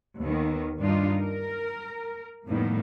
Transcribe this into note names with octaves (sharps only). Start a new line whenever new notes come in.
D#2 D#3 B3
G2 G3 D4 D#4 F4
A#4
F2 A2 D#3 G3 A#3 B3